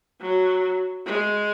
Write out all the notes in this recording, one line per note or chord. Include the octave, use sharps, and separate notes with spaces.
F#3
G#3